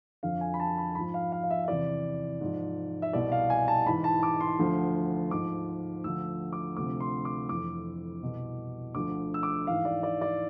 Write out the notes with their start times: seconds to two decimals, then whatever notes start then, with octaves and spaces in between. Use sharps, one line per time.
0.23 F2 D3 F3 F5
0.41 G#5
0.54 B5
0.60 A5
0.78 B5
0.95 G#2 F3 B5
1.14 F5
1.32 F5
1.43 F5
1.50 E5
1.64 E5
1.68 E2 C3 E3 D5
2.41 G#2 F3
3.02 E5
3.13 C2 B2 D5
3.32 F5
3.50 G#5
3.68 A5
3.86 G#2 E3 B5
4.04 A5
4.23 D6
4.41 C6
4.59 D2 D3 F3
5.31 G#2 F3 D6
6.04 D2 D3 F3 E6
6.53 D6
6.76 D2 C3 F3 D6
7.00 C6
7.25 D6
7.49 F2 E3 D6
8.22 C2 B2
8.94 D2 D3 F3 D6
9.34 E6
9.43 D6
9.67 G#2 E3 F5
9.85 D5
10.03 D5
10.21 D5